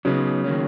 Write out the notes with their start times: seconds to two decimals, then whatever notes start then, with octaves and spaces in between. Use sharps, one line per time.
0.05 C#3 F#3 B3 D#4
0.44 D#3 F#3 A#3 C#4